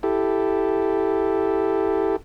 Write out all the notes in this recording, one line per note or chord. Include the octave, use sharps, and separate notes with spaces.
E4 G4 A4